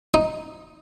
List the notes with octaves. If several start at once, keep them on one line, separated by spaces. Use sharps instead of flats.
D#4